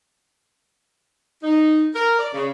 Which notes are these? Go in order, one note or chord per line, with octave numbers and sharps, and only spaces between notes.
D#4
A#4
D5
C#3